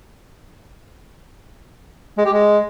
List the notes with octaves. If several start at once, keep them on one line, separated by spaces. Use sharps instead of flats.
G#3
G4
G#3